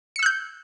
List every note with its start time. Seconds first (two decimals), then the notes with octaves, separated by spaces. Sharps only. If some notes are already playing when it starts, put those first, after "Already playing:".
0.16 C#7
0.19 E6
0.23 F#6
0.26 G6